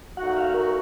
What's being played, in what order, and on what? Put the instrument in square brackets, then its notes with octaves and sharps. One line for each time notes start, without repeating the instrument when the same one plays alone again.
[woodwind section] A#2 A3 D#4 F#4 [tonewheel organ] F#5
[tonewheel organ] F5
A#4